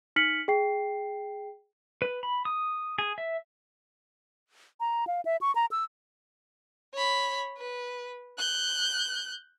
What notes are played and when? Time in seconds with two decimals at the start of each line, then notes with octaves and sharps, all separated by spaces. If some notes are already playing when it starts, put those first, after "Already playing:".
0.16 D#4 F6 B6 C#7 F#7
0.48 G#4 G5 C7
2.02 B4
2.23 B5
2.45 D#6
2.98 G#4
3.18 E5
4.80 A#5
5.07 F5
5.25 E5
5.41 C#6
5.55 A#5
5.71 E6
6.94 C#5 B5
7.58 B4
8.39 F#6 G6